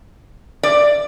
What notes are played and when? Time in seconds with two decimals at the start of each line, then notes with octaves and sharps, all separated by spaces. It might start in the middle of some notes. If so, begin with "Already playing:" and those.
0.63 D5